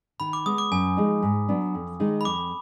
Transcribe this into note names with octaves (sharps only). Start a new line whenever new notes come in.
D#3 B5
D6
G#3 B3 D#6
D6
F#2 G#5
F3 G#3 D#4
G#2
F#3 B3 D4
F2
D#3 G#3 D#4
B5
F2 D6